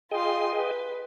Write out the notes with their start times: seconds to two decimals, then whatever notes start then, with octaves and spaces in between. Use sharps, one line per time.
0.11 F4 G#4 D#5 G5 C6
0.55 B4